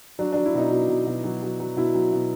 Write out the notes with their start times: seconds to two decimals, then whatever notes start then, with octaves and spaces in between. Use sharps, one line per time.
0.19 F#3 D4
0.32 F#3 D4
0.46 E4
0.55 B2 D#4
0.71 B2
0.89 B2
1.06 B2
1.24 F#3
1.43 F#3
1.60 F#3
1.77 B2 E4
1.94 F#3
2.13 B2